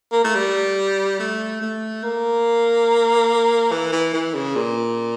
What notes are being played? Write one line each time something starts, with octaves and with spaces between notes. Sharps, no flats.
A#3
A3
G3
A3
A3
A#3
E3
E3
E3
C#3
A#2